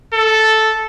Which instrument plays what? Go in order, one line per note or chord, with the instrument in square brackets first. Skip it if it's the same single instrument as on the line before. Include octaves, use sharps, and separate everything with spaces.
[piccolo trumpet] A4